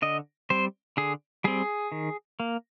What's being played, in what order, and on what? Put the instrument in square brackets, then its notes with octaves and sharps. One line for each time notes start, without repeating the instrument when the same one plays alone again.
[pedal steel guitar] D3 D#5
G3 C4 C5
D3 G#4
G3 C4 G#4
D#3
A#3